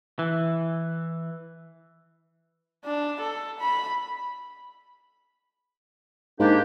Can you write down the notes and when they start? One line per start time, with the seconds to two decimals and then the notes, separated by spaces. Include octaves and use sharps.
0.19 E3
2.85 D4
3.20 A4
3.60 B5
6.39 G#2 A#3 D4 G4